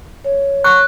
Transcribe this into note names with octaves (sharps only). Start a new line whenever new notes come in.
C#5
C#6 F#6